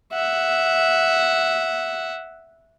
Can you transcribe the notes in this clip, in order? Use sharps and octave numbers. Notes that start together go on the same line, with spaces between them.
E5 F#5